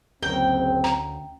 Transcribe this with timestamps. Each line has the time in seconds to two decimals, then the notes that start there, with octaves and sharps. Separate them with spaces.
0.23 F#1 D2 C4 C#4 A#4 G5
0.84 A#5